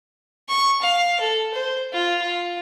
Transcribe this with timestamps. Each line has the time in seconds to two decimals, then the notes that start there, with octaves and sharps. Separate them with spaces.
0.49 C#6
0.82 F5
1.20 A4
1.54 C5
1.93 F4
2.22 F4